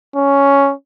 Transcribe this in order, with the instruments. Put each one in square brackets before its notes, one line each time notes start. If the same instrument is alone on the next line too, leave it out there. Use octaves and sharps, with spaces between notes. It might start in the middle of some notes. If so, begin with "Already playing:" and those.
[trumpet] C#4